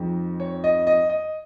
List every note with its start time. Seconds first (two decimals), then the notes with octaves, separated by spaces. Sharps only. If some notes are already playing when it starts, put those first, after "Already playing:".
Already playing: F2 F3 G#3 D#4
0.40 C#5
0.64 D#5
0.87 D#5
1.09 D#5